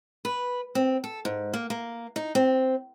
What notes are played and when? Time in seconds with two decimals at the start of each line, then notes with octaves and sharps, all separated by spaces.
0.25 B4
0.75 C4
1.04 A4
1.25 G#2
1.53 A#3
1.70 A#3
2.16 D#4
2.35 C4